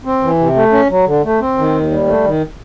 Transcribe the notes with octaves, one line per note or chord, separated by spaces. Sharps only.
C4
E3
C3
A3
C#4
F#3
D3
A3
C4
D#3
D#2
G3
A3
D#3